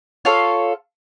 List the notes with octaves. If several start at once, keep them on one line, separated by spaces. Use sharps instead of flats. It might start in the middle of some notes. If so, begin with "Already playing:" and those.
F4 A4 C#5 F5